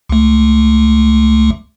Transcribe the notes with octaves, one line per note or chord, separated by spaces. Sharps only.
C#2 A3